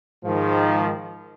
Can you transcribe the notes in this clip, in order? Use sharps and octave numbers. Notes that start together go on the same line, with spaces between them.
G#2 D#3 F3